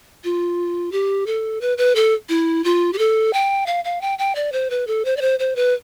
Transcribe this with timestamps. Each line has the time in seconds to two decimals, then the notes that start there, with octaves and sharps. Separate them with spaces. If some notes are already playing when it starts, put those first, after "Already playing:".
0.24 F4
0.92 G4
1.26 A4
1.61 B4
1.78 B4
1.96 A4
2.29 E4
2.64 F4
2.93 G4
2.98 A4
3.33 G5
3.66 F5
3.85 F5
4.01 G5
4.19 G5
4.35 D5
4.52 C5
4.70 B4
4.87 A4
5.05 C5
5.17 D5
5.21 C5
5.39 C5
5.56 B4